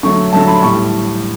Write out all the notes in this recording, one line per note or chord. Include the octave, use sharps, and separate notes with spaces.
D3 F#3 A3 C#6
D3 F#3 A3 A5
B5
A2 G3 C#6